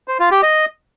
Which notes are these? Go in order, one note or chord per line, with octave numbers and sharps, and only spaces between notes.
C5
F4
G4
D#5